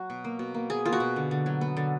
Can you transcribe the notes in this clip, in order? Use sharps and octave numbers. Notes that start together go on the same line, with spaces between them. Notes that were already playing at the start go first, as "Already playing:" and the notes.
Already playing: F#3 F#4
B2
A#3
B2
A#3
B2 G#4
A#3 F4
F#4
B2
D3
D3
F#3
B3
D3